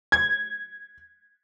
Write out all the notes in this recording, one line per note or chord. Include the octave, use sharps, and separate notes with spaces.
G#6